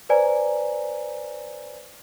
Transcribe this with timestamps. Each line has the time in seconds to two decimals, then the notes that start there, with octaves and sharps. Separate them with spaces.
0.09 B4 C5 D5 G#5 A#5